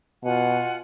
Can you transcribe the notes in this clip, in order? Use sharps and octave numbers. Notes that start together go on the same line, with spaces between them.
B2 F4 F#5 G#5